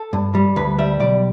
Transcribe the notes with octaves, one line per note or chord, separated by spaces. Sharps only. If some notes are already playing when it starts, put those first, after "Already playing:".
Already playing: A4
G2
G3
D2 B4
G3 E5
B1 D5